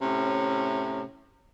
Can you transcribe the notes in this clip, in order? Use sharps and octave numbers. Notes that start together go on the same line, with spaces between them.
A2 C3 C#4